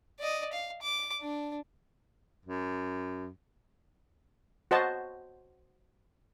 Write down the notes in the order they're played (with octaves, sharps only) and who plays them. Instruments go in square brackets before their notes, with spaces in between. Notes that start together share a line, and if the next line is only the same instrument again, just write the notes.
[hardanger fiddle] D5 D#5
F5
D6
D4
[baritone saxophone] F#2
[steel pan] F#4 C5 D#5 A5